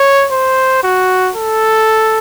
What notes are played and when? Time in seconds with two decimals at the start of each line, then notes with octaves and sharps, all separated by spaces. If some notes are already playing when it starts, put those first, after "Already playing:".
Already playing: C#5
0.32 C5
0.84 F#4
1.36 A4